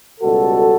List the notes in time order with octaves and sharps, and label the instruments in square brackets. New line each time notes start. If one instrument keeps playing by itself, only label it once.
[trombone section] C#2 B2 G3 F#4 A4